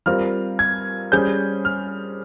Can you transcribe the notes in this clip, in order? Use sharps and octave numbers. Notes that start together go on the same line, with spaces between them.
G3 C4 F4 A#4 F6
G#6
G3 C#4 G#4 C5 G6
F6